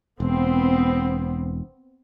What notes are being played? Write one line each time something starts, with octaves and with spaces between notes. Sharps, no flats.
E1 B3 C4